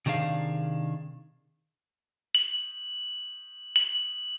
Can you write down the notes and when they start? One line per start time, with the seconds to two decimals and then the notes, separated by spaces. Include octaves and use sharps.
0.06 C3 D#3 D4 G#4 F5
2.35 F#7
3.76 F#7